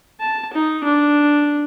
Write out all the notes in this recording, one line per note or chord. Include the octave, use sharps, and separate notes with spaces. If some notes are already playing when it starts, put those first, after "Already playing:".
A5
D#4
D4